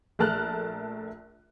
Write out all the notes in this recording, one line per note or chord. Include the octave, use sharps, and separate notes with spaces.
A#1 A3 A#4 A5 F6 F#6